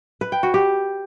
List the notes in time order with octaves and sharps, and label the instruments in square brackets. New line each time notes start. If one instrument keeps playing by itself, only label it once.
[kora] B4
G5
F#4
G4